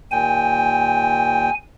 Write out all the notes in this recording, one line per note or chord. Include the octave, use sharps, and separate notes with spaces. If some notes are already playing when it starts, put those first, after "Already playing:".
D#2 A#2 G5 G#5